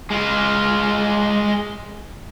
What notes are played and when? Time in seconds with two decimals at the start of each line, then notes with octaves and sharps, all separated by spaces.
0.10 G#3 F4